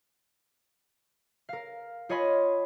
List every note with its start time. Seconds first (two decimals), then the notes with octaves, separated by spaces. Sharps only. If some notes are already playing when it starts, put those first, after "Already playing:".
1.49 A#4 F5
2.09 F4 C#5 D#5 G#5 B5 C6